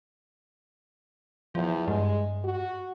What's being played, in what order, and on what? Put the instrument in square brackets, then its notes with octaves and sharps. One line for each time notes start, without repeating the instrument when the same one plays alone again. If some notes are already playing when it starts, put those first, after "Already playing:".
[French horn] E2 [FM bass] F3
[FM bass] G2 [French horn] G#3
[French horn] F#4